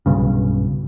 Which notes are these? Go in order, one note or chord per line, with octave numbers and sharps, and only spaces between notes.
B1 G2 C#3